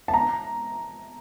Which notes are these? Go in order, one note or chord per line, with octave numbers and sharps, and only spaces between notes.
A5
A#5